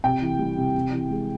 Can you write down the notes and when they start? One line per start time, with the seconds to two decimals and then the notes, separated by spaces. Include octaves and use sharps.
0.04 C3 G5
0.22 E3
0.39 G3
0.58 C3
0.75 C3
0.92 E3
1.10 G#3